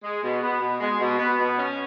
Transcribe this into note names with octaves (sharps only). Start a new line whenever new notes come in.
G#3
B2
B3
B2
G#3
B2
B3
B2
C#4